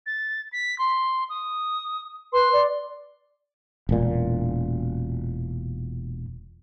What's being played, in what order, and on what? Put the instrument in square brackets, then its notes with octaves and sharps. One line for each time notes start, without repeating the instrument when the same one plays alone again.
[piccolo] A6
B6
C6
D#6
[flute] B4 [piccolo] C6
[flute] D5
[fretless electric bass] E1 A#2